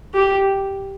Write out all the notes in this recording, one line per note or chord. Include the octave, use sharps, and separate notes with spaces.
G4